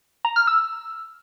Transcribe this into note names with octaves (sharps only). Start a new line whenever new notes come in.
A#5
F6
E6